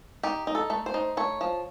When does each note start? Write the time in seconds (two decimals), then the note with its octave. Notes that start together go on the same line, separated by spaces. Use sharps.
0.23 D#4 G4
0.47 D#4
0.55 A4
0.70 A3
0.86 C5
0.94 D#4
1.17 A3 C#5
1.41 F3